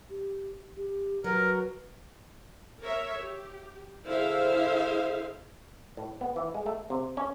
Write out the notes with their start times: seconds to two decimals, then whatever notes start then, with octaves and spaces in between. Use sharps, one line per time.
0.10 G4
0.76 G4
1.24 F#3 A#4 B4
2.81 A#4 C#5 E5
3.20 G4
4.05 D3 E4 G#4 C5 E5 F5
5.97 A2
6.21 B3
6.36 E3
6.54 G#3
6.66 A3
6.90 C3
7.17 C#4